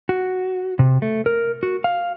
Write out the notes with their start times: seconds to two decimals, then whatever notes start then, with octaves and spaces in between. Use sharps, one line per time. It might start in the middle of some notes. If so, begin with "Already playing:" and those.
0.09 F#4
0.79 C3
1.02 A3
1.26 A#4
1.63 F#4
1.84 F5